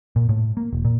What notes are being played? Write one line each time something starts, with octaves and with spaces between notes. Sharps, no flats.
A#2
A2
A#3
E1
A#2